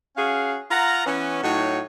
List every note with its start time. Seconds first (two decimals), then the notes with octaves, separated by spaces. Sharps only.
0.17 C#4 F#4 G#4 F5
0.71 F4 F#5 A#5
1.06 E3 B3 C#4
1.43 A2 F#3 D#4 F#4 C#5